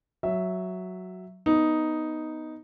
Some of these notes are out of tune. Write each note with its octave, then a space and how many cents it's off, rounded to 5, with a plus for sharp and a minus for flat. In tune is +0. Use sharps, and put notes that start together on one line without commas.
F#3 +0 E5 +0
B3 +0 D#4 +0